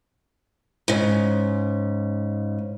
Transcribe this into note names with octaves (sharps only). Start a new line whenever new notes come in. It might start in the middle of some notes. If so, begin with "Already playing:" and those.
G#2 C#3